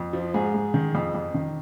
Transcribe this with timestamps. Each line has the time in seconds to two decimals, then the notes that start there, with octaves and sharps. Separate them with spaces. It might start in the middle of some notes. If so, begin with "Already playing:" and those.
Already playing: F2
0.13 F3
0.34 G#2 G#4
0.54 G#2
0.74 D#3
0.95 F2
1.15 F2
1.34 D#3